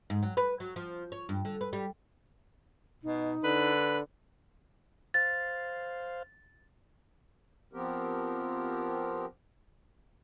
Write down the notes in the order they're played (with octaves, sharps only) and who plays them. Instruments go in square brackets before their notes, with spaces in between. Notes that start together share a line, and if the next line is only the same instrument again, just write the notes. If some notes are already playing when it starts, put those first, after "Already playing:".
[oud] G#2
F#3
B4
F#3
F3
C#5
G2
D3
B4
G3
[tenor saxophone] B2 [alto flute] D#4
[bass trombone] D3 [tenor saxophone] B4
[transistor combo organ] C5 F5 [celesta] A6
[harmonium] F3 B3 C4 G4 A#4